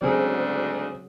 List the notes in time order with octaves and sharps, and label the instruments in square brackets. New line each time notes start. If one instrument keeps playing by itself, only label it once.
[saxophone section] D2 G#2 D5 [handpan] C#3 F#3 [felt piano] C4 G#4